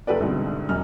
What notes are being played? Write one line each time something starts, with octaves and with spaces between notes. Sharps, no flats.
F#1 G4 A4 B4 D5
C2 G#2 B2 D3
E1 F#2 F6